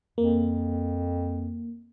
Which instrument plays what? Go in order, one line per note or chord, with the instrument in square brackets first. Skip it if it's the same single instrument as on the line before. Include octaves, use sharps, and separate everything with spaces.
[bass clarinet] F2 [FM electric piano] A#3